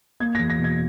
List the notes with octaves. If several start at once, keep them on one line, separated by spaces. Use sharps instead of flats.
A#3 G#6
E2 A#6
A#6
B2
G#6